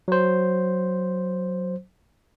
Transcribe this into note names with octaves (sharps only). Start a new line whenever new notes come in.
F#3 C5